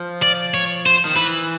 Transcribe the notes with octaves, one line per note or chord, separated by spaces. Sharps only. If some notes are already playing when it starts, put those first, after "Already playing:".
Already playing: F3
D5
C#5
C5
D#3
E3 B4